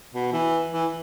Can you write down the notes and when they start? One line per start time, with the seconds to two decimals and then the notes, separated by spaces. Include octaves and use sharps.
0.14 B2
0.33 E3
0.72 E3